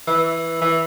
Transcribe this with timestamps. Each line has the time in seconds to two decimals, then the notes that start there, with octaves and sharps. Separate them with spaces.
0.07 E3
0.62 E3